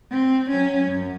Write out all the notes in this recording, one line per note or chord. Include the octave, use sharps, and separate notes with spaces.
C4
F#3 C#4
F#2